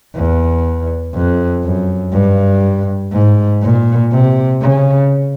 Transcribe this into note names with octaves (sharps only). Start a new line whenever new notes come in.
E2
F2
F#2
G2
G#2
A#2
C3
C#3